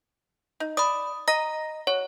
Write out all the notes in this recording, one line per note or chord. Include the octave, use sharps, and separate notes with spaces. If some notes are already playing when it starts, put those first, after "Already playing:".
D#4
D5 B5 D#6
D#5 A#5 A#6
F#4 C#5